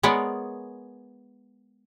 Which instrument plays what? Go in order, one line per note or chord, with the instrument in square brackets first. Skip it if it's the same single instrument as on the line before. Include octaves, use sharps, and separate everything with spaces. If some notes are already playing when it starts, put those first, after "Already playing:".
[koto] G#3 B3 A#4 B4 C#5 D5